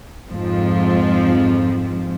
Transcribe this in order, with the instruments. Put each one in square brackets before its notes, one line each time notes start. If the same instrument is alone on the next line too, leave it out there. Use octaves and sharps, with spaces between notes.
[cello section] F2 G#2 F3